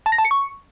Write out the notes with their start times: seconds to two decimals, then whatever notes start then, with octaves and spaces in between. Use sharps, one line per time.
0.06 A5
0.12 A#6
0.18 A5
0.25 C#7
0.31 C#6